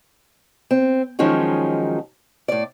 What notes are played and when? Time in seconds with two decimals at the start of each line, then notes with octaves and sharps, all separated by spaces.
0.71 C4
1.19 D#3 F3 F#3 G#3 C#4 D#4
2.48 A2 D5